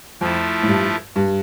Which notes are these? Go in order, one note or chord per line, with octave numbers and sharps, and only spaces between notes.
F2 F3 A3 E4
A2
G2
G2